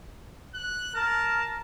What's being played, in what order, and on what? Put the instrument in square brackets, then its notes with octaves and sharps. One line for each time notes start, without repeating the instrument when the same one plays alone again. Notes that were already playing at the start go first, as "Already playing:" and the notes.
[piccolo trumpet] F#6
[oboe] A#4 [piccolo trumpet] A5